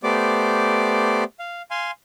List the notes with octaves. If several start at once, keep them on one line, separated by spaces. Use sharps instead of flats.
A3 B3 G4 C5 D5 D6
F5
F5 G#5 C6